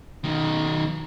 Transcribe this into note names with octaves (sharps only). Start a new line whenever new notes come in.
B1 D#3